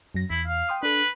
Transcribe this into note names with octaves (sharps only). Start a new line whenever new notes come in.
F#2 F#3 A#6
E2 E4
F5
G5 C6 D#6
D4 A4 B4